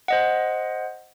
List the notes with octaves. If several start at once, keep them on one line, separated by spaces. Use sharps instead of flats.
C5 D#5 F#5